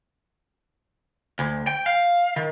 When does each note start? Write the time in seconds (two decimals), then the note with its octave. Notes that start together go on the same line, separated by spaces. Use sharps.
1.39 D2
1.67 G5
1.86 F5
2.36 D#3